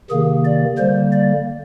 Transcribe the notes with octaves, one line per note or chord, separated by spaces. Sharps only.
C3 D#3 A#3 G#4
D5
D3 G3 A#3 C5
D5